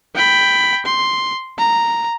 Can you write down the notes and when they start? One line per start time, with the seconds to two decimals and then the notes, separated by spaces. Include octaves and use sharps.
0.15 G5 B5
0.86 C6
1.58 A#5